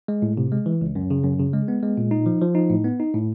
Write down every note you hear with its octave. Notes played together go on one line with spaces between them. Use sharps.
G#3
A2
C3
G#3
E3
C#2
F#2
C#3
F#2
C#3
G#3
B3
G#3
A#2
D#4
F3
F3
D#4
A2
B3
D#4
A2